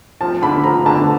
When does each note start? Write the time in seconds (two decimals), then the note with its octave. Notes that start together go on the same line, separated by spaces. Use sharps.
0.21 F3 A5
0.42 D3 B5
0.64 F3 A#5
0.86 D3 A5